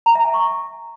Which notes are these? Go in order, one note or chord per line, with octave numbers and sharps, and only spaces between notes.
A#5
E5
G#5
C#6